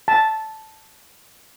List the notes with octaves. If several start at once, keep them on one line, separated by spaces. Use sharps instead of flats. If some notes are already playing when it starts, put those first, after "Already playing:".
A5